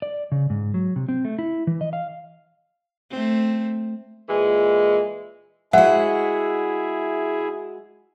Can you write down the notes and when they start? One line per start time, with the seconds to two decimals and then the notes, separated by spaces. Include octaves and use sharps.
0.02 D5
0.32 C#3
0.50 G#2
0.74 F#3
0.96 C3
1.09 C4
1.25 A3
1.39 E4
1.67 E3
1.81 D#5
1.93 F5
3.11 A3 C4
4.28 A#2 E3 G#3
5.73 G#3 E4 F#4 G#4 C5 E5 F#5